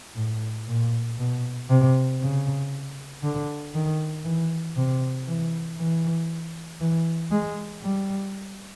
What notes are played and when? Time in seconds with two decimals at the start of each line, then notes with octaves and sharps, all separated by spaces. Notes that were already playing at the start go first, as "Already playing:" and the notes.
0.15 A2
0.68 A#2
1.18 B2
1.70 C3
2.20 C#3
3.23 D3
3.74 D#3
4.24 E3
4.76 C3
5.27 E3
5.78 E3
6.80 E3
7.31 G#3
7.82 G3